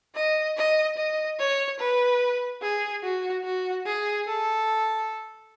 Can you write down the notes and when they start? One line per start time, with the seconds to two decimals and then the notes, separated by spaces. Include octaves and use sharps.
0.15 D#5
0.57 D#5
0.98 D#5
1.40 C#5
1.80 B4
2.62 G#4
3.03 F#4
3.44 F#4
3.86 G#4
4.27 A4